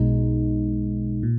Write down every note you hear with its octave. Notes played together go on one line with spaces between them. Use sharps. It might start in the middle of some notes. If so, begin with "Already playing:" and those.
Already playing: B1 B2 G#3 D#4
A#2